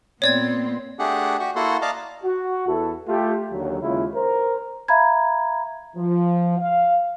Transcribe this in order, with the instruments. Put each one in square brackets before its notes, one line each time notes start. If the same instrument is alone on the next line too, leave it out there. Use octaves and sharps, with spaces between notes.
[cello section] A#2 B3 C4 [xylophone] C#5 D5 G#6
[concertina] A3 D4 G4 G#4 F#5
F#4 G4 C#6
A#3 E4 F#4 A4 F#5 C6
D5 D#5 F5 A5 A#5 D6
[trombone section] F#4
E2 E4 A4
A3 F4 G4
D#2 D3 F#3
D#2 C#3 G#3 E4 F4
A#4 C5
[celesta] E5 F5 A#5 B5 G#6
[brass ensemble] F3
F5